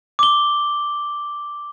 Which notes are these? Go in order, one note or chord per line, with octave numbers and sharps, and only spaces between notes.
D6 G7